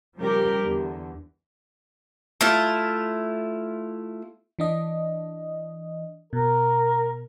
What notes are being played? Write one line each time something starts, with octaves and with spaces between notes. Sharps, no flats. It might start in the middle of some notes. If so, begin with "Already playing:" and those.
C#3 F3 G3 G4 A#4
E2 D3
A3 E4 F4
E3 D4 D#5
B2 A#4